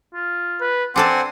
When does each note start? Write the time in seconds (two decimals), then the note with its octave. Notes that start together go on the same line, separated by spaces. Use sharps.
0.14 F4
0.61 B4
0.96 C4 D4 A4 C5 D5 F#5 G#5 C6